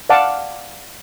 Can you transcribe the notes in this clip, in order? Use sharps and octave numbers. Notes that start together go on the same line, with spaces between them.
D5 F5 F#5 A5 D6